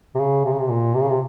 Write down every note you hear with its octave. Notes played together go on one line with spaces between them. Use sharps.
C3
C#3
C3
C#3
C3
A#2
C3
C#3
C3